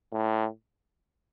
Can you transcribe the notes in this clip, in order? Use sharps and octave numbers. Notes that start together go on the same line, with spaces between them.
A2